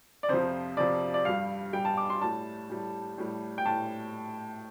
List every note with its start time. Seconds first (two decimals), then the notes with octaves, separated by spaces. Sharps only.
0.23 D5
0.29 F2 C3 F3 C5
0.77 F2 C3 F3 D5
1.14 D5
1.25 G2 G3 F5
1.73 G2 G3 G5
1.85 A5
1.97 D6
2.10 C6
2.21 A2 G3 A5
2.69 A2 G3
3.18 A2 G3
3.58 G5
3.65 A2 A5